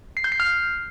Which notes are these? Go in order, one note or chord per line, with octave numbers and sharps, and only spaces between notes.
C7
G6
C7
F6